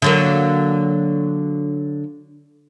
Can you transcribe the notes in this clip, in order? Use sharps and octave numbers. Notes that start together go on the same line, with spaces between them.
D3 F#3 A#3